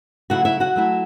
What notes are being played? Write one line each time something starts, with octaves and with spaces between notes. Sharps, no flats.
C#3 F#3 A3 E4 F#4 F#5
E4 E5
F#4 F#5
F#3 A3 E4